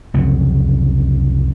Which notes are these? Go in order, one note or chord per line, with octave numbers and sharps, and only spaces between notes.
C2 F2 C#3 F#3